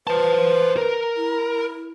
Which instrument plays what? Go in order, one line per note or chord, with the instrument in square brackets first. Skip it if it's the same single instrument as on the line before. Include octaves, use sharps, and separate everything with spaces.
[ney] B4 [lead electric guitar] C5 A5
[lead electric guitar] A#4
[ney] E4